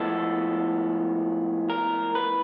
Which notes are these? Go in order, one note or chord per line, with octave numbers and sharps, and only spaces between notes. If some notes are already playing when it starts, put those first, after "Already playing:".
Already playing: A2 F3 G#3 B3 A4
A#4
B4